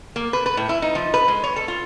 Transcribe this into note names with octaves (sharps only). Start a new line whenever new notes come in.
A#3
B4
B4
A2
E4
D#4
F3
B4
G#3
C#5
A4
F4